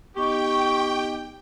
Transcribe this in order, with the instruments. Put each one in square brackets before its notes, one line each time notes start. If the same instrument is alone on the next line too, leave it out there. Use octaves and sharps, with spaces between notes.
[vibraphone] B3 D#4 D#5 [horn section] G4 [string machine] G5 [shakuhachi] C#6